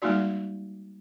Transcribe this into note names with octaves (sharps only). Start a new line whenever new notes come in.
G3 G#3 A#3 D#4 F#4 D5